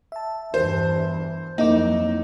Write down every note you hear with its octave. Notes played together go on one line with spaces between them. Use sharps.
E5 A5
E2 G2 E3 C5
F2 F#3 A#3 D#4 E4 D6